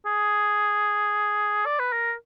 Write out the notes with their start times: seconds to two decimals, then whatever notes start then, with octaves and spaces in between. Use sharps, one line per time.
0.06 G#4
1.66 D5
1.79 B4
1.93 A#4